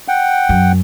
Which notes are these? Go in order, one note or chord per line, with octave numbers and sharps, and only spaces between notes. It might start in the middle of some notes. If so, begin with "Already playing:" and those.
F#5 G5
F#2